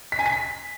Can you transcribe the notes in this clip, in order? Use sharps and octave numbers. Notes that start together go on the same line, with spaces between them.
B6
G#5
B6